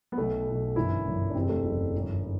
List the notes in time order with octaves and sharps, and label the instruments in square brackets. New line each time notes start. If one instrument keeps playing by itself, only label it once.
[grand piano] B3
B1 B2 A3
B1 B2
G1 F#2 E3 E4
G1 F#2 E3
D4
F#1 E2 C3 E3 C4
A3
F#1 E2 C3 E3
G1 F#2 E3
E3